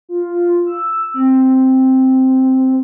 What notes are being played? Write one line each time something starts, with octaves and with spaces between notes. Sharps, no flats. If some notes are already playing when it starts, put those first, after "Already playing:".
F4
E6
C4